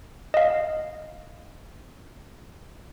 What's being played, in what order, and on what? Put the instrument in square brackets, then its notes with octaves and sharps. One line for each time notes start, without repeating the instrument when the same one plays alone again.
[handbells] D#5 F5